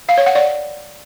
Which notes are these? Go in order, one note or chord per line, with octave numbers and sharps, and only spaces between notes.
F5
C#5
F#5
D5